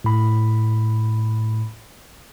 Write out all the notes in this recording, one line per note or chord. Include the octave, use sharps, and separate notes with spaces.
A2 B5